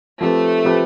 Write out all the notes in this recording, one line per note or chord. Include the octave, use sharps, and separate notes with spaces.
F3 A3 C4 G4 B4
F3 C4 G4 B4